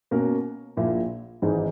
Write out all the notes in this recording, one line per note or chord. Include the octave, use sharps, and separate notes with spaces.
B2 A#3 C#4 F#4 A#4
A#1 A#2 A#3 E4
G#1 G#2 E3 G#3 D#4